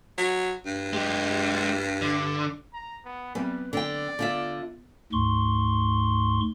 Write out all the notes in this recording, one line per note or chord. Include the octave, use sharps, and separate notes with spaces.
F#3
G2
G#3 G4
D3
A#5
B3
F#3 G3 B3 C4 B4
D3 D5 G5
D3 B3 F4 E5
D2 G#2 C6 C#6